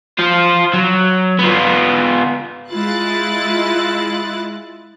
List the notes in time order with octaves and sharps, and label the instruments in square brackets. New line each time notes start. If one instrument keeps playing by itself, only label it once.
[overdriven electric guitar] F4 C5
F#3
B3 F4
[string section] G#3 E4 F4 F#6 A6